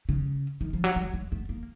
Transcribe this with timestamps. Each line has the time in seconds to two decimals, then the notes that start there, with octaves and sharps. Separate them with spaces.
0.09 C#3
0.61 D#3
0.73 F3
0.84 F#3
0.96 G3
1.14 G#3
1.32 A3
1.49 A#3